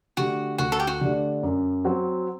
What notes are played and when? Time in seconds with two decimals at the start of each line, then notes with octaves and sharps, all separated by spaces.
0.17 D3 A3 D4 F#4 G4
0.58 D2 F#4
0.72 A4
0.80 G4
0.87 F#4
1.01 D3 A3 D4 G4
1.43 F#2
1.85 F#3 C4 F#4